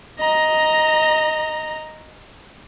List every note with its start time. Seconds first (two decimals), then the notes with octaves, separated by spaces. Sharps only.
0.20 D#5 A#5